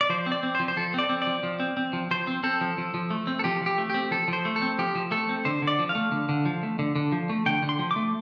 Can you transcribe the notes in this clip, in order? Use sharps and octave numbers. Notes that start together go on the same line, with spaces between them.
D5
F3 C5
C4
D5
C4
C5
F3
C5
F3 A4
C4 D5
C4
F3 D5
F3
C4
C4
F3
F3 C5
C4
C4 A4
F3
F3
F3
A3
C4
A4
F3 G4
F3 G4
A3
C4 G4
F3 A4
F3
C5
A3
A4
C4
F3 G4
F3
A3 A4
C4
D3 C5
D3
D5
F3
F5
A3
D3
D3
F3
A3
D3
D3
F3
A3
D3 G5
D3
C6
F3
D6
A3